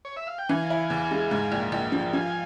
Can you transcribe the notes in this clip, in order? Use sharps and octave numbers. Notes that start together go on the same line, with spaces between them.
C#5
E5
F5
G5
E3 F5 G#5
E4
E2
G#3
G#2
A#1
A#1
F3
F3 F5 G#5